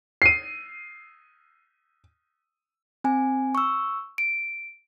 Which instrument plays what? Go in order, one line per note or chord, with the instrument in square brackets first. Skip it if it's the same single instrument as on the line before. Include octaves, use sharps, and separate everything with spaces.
[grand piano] C7 D#7
[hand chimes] C4 G#5
C#6 E6
D7